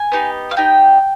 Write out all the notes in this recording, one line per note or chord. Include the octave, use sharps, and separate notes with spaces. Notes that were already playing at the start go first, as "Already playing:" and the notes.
Already playing: G#5
B3 D#4 G4
F5
B3 D#4 G4 G5